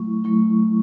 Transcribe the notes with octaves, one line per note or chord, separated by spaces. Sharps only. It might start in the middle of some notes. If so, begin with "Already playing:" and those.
Already playing: F#3 A3 E4 C#6
F#3 A3 E4 C#6